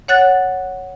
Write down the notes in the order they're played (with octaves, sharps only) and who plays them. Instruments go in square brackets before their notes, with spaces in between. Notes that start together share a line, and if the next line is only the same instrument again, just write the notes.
[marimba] C#5 F#5 F#6 A6